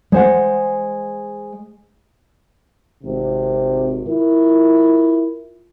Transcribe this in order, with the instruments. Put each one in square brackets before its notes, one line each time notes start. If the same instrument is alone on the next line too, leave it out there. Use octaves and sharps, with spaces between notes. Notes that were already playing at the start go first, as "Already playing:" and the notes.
[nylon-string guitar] G#3 C5 F#5
[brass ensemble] G#1 [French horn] C3
[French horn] E4 [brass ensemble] F4 A#4